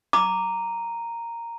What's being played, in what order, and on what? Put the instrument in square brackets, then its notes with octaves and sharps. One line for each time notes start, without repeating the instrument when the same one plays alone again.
[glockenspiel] A#5 D#7 [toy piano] D6